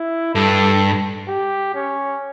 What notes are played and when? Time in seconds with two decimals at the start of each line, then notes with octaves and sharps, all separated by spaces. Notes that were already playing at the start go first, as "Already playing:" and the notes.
Already playing: E4
0.35 G2 A4
1.28 G4
1.75 C#4